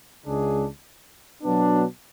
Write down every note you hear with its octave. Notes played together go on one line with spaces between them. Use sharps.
C#2 C#3 G#3 D4 G#4
B2 F#3 B3 D4